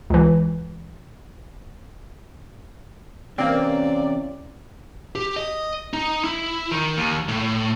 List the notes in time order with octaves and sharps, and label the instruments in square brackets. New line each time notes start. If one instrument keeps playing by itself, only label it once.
[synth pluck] C#2 E3
[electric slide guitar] C3 E3 [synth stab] A#3 C4 [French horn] C#4 [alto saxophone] D5
[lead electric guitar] G4
D#5
D#4
E4
D#3
D#2
A2